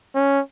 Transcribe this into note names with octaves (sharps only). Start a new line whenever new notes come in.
C#4